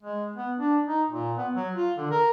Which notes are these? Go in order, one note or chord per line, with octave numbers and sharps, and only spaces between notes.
G#3
B3
D4
D#4
A#2
B3
F#3
F4
D3
A#4